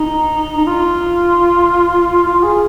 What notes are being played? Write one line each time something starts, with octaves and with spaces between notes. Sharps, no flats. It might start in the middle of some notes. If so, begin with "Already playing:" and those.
Already playing: D#4
D#4
F4
F4
G#4